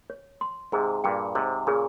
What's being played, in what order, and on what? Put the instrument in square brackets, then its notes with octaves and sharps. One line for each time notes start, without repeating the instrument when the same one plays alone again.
[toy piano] C#5
C6
[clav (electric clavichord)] G#2 C3 [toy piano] G#4
[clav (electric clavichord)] G2 A#2 [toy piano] G5
[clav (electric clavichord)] G#2 C3 [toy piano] C#5
[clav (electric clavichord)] A#2 C#3 [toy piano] G#4